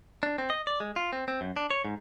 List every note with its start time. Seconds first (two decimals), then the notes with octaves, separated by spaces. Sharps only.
0.23 D4
0.38 C4
0.50 D#5
0.67 D5
0.80 G#3
0.96 F4
1.13 C4
1.28 C4
1.41 F#2
1.56 D4
1.70 C#5
1.85 G#2